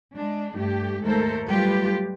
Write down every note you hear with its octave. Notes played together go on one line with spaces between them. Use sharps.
G#3 D4
G2 A3 G4
D#2 G#2 A3 A4 A#4 C5
F#3 G3 A3 F4 G4 B4